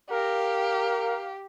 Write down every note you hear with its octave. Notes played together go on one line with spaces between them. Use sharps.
G4 A#4 F5